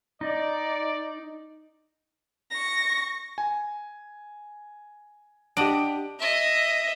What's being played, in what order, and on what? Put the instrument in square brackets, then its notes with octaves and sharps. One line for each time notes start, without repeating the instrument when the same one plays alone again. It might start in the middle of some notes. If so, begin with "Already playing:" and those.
[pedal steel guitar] D#4 [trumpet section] D5
[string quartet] C#6 A#6
[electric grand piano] G#5
[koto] D4 D#5 F#5 [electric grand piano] G4 D7
[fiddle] D#5 E5